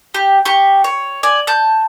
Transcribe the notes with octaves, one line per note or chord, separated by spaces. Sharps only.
G4
G4 C#6
C#5
D5 G#5
A5 G6